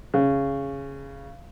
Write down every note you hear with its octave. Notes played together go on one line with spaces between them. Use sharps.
C#3